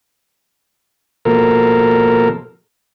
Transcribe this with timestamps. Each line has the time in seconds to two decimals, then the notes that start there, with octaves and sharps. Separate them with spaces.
1.25 B2 F3 A#3 A4 A#4